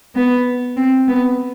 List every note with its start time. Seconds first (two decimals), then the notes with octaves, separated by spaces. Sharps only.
0.15 B3
0.77 C4
1.08 B3